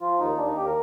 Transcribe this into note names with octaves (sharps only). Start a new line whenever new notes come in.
F3 F4
D#2 D#4
D#2 D4
D#4
D#2 G4
A#4